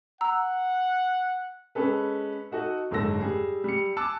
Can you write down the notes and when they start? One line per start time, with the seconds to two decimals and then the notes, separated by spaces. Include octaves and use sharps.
0.21 F#5 A#5 E6
1.75 G#3 C#4 G#4 A4 B4
2.51 D#4 F#4 A4 D#5
2.91 F#1 G#2 D3 A4 E6 A#6
3.20 G3 G#4
3.64 G3 C#7
3.97 G#5 A5 D6 E6 F#6